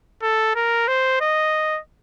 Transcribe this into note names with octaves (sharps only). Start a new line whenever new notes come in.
A4
A#4
C5
D#5